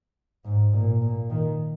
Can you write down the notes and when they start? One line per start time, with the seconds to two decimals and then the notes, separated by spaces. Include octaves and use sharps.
0.44 G#2
0.73 A#2
1.02 A#2
1.30 D#3